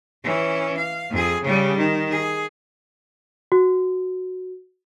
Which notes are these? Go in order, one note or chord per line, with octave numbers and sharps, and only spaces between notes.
E3 C#4
F5
F2 G#4
C#3 G3
D#3
G#4
F#4